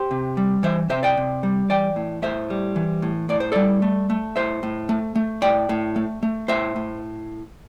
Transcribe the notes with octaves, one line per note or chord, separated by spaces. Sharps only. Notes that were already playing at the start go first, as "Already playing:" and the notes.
Already playing: G4 C5
C3
G3
E3 C5 E5
C3 C5 E5
D5 G5
C3
G3
E3 D5 G5
A2
A2 C5 E5
G3
E3
A2
A2 D5
C5
G3 A4 D5
A3
A3
A2 C5 E5
A2
A3
A3
A2 D5 G5
A2
A3
A3
A2 C5 E5
A2